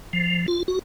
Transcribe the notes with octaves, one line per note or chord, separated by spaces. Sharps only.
F3
F4
F#4